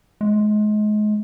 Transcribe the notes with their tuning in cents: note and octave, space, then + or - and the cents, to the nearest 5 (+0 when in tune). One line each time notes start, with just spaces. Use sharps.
G#3 +30